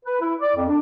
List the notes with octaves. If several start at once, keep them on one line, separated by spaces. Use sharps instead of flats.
B4
E4
D5
F2
D4